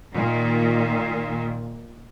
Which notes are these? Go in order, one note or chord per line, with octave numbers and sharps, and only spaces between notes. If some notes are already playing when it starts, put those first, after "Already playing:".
A#2 D#3